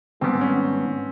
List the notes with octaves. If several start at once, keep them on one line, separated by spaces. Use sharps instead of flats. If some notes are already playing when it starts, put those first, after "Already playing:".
G#2 D#3 G3 B3 C4 D4
C#4